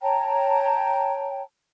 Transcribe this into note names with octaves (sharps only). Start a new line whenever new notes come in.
C#5 G5 A5 A#5